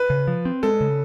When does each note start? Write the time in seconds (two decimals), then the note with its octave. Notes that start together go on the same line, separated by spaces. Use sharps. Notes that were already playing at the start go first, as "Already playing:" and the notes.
Already playing: B4
0.10 C#3
0.27 F3
0.45 C4
0.63 G#3 A4
0.81 C#3